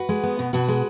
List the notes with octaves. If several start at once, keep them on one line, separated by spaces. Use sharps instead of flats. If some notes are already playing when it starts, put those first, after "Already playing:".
Already playing: F#4 B4
G#3
B3
B2
B2 F#4 B4
G#3